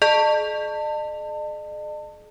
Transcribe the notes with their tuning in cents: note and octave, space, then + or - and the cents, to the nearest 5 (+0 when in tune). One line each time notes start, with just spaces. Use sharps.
G#4 +40 D#5 -45 A5 +30